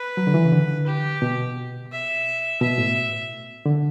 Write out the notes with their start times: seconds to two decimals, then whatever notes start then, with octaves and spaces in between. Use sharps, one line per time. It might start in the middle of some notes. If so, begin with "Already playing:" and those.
Already playing: B4
0.17 F#3
0.27 D3
0.34 E3
0.45 C#3
0.52 D3
0.87 G4
1.22 B2
1.92 E5
2.61 B2 E5
2.78 A2
3.66 D3